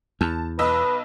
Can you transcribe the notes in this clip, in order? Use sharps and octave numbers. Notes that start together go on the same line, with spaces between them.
E2 A5
B1 B4 D#5 E6